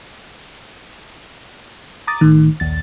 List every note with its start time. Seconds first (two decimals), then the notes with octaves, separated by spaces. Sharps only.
2.07 A#5 D6 D#6 A6
2.21 G#1 A2 D#3
2.60 A#1 D#2 A6